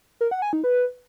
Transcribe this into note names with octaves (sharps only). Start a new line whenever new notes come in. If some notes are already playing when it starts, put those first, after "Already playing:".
A#4
F#5
G#5
D#4
B4